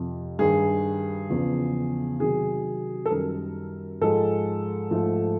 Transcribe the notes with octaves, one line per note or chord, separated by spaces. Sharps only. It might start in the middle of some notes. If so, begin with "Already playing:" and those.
Already playing: F2 C3 F3
G2 D#3 G3 G#4
E2 C#3 F3
C3 D#3 F#3 G#4
A4
F#2 D#3 G3 A#4
G#2 F3 G#3 A4
G#2 F3 A3